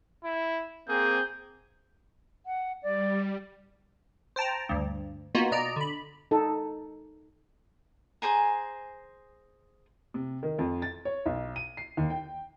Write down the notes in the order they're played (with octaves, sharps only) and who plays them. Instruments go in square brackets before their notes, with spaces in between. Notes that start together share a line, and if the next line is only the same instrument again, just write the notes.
[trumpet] E4
[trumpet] A#3 [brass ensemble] C4 G#4 [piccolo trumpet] G6
[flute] F#5
[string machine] G3 [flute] D5
[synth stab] C5 G5 A5 A#5
D2 G2
A#3 B3 D#4 F4 F#4
B2 D5 D#5 A#5 D7
D3 B5
[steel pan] D#4 A4
[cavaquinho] G#4 C5 G#5 A#5
[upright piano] C3
D#3
F2
A6
C#5
B1
D#7
C7
D#2
G5